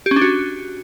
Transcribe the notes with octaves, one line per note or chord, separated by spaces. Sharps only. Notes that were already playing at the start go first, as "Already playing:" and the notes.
G4
C#4
D4
F#4